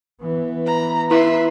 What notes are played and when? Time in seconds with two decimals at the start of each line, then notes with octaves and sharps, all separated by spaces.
0.23 E3 B3
0.66 A#5 B5
1.11 E4 B4 E5 C6